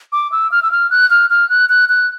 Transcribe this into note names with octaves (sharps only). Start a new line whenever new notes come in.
D6
E6
F6
E6
F6
F#6
F6
F6
F#6
F#6
F#6